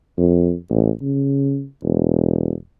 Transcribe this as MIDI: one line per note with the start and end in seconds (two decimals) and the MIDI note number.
0.18 0.54 41
0.70 0.90 33
1.02 1.65 49
1.83 2.53 28